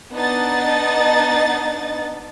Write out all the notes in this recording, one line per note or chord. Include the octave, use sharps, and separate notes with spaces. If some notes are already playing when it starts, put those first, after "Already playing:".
B3 D4 D#4 D#5 F#5 A6